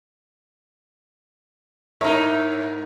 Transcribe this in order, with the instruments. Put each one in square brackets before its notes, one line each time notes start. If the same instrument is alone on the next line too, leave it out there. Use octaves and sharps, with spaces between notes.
[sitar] G#2 D#4 [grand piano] A#4 [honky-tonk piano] C#5 E5